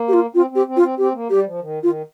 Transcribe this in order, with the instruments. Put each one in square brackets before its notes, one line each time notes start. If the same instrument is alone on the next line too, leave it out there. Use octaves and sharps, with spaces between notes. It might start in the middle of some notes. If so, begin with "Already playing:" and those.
Already playing: [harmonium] A#3
[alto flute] G4
F4
[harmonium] C4 [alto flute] F4
[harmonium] C4
[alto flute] G4
[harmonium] C4
[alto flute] F4
[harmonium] C4
[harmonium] C4 [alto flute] G4
[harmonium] A#3
[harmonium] G3 [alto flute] G4
[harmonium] F3
D#3
[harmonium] D#3 [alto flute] F4